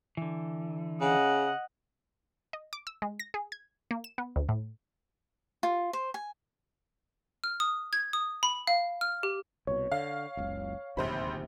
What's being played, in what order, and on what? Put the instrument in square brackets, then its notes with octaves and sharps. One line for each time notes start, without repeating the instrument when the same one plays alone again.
[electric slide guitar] D3 E3
[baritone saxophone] C#3 [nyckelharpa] D#5 F#5
[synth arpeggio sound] D#5
D6
E6
G#3
A#6
G#4
G#6
A#3
E7
B3
D2
A2
[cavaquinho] F4
C5
G#5
[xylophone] F6
D#6
G#6
D#6
B5
F5
F6
G4
[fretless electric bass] C2 B2 [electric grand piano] C#5
[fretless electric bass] D3 [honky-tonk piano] F5
[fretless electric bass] F#1 C#2
[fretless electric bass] D1 D#2 C3 [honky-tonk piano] A#1 C5 B5